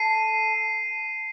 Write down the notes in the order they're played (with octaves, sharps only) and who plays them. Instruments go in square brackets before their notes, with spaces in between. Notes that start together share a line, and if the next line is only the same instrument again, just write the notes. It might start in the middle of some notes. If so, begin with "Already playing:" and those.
Already playing: [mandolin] A4 [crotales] C7 D#7